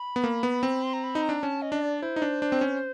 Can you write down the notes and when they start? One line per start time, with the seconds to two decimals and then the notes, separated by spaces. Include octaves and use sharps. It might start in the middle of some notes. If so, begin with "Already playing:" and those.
Already playing: B5
0.16 B3
0.24 A#3
0.43 B3
0.63 C4
0.83 C6
0.93 A#5
1.04 B5
1.15 D#4
1.23 A#5
1.29 D4
1.43 C#4 A5
1.62 D#5
1.72 D4
1.82 D5
2.02 E4 C5
2.16 D#4
2.22 D4
2.42 D4
2.52 C4
2.61 C#4